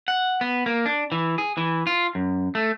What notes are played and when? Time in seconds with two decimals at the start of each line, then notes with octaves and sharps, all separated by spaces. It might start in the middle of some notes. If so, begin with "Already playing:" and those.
0.08 F#5
0.41 B3
0.66 A#3
0.86 D4
1.12 E3
1.38 G#4
1.57 E3
1.87 F4
2.15 F#2
2.55 A3